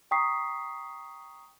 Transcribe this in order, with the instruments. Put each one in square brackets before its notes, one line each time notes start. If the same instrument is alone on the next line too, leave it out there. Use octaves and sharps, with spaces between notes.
[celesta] G5 A#5 C#6 D#6 B6 C7